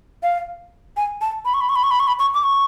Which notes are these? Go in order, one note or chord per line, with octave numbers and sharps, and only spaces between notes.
F5
G#5
A5
B5
C#6
B5
C#6
B5
C#6
B5
C#6
B5
C#6
D6
C#6